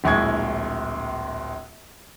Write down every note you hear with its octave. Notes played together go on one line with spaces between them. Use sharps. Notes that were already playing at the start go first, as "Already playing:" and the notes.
D1 A#1 G#3 E4 C#6 G#6